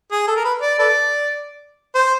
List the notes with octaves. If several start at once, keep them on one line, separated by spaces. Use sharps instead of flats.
G#4
A4
A#4
B4
D5
A4 B4 D5
C5